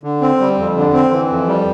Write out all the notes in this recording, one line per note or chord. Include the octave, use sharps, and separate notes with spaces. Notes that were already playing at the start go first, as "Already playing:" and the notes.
D3
C4
G3
F2
D3
C4
E3
F2
G3